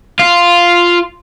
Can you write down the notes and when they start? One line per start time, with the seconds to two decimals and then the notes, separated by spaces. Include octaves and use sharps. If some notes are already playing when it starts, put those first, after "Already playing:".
0.19 F4